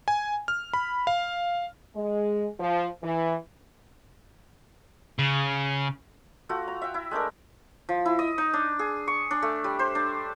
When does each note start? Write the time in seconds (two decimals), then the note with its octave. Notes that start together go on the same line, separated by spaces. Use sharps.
0.08 G#5
0.48 F6
0.73 B5
1.07 F5
1.96 G#3
2.59 F3
3.03 E3
5.19 C#3
6.49 A3 F4 F#4
6.68 A#5
6.82 E5 G5
6.94 E4
7.11 G#3 A3 D4 A#4
7.89 F3
8.05 E4
8.19 D#5
8.38 D#4
8.54 D4
8.79 G#4
9.08 C#6
9.31 D4
9.42 A3
9.64 G3
9.79 C5
9.95 D4